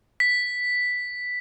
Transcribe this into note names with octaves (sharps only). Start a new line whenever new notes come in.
B6